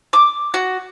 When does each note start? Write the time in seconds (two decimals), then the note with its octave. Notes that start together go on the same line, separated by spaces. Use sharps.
0.13 D6
0.54 F#4